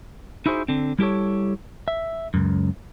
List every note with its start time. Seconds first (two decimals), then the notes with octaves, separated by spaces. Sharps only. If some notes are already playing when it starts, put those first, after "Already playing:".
0.46 D#4 E4 F#4 G#4 C5
0.68 D3 C4
0.99 G3 E4 G4 A4 C#5
1.88 E5
2.34 C#2 F#2